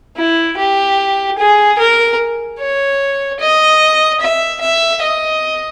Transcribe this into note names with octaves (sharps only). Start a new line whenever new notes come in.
E4
G4
G#4
A#4
C#5
D#5
E5
E5
D#5